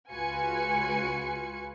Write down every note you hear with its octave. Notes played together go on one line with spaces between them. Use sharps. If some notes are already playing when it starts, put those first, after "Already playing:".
C#2 F4 F#4 B4 G#5 C#7